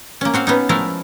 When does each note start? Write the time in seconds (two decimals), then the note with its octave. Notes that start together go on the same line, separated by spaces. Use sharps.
0.21 A#3 C#4
0.34 C4 F#4 F5
0.47 B3 C#4 D#4
0.69 F3 G#3 A3 E4 A#4 F5